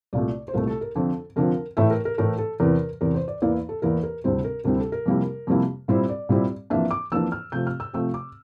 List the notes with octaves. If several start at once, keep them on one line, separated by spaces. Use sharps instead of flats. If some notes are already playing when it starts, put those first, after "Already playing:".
C2 A#2 A3 D5
C5
C2 A#2 A3 A#4
A4
A#4
F2 D3 F3 C4 A4
F2 D3 F3 C4 A#4
A2 E3 A3 E5
A#4
A#4
A2 E3 A3 A#4
A4
E2 C3 E3 A#4
E2 C3 E3 A#4
C5
D5
E2 E3 A#3 E4 D5
A4
E2 E3 A#3 E4 A#4
A#4
D2 C3 G3 C4 E4 C5
A#4
D2 C3 G3 C4 E4 A#4
A4
A#4
F2 C3 G3 A#3 E4
F2 C3 G3 A#3 E4
A#2 G3 C4 E4 C5
D5
A#2 G3 C4 E4
F2 E3 A#3 D4 E5
D6
F2 E3 A#3 D4 E6
F6
C3 F3 A3 C4 G6
F6
E6
C3 F3 A3 C4 E6
D6